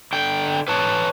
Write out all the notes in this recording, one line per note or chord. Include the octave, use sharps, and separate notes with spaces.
D3 G5
B4 C#5 A5